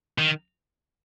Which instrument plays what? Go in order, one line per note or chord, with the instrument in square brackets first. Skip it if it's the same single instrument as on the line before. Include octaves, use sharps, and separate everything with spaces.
[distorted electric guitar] D#3